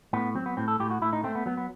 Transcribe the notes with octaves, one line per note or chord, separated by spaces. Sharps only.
A2 B3
F#3 C4
B3
A2 C4
A4
A2 G4
F#4
A2 E4
D#4
A3 C4
B3
F#3 B3
B3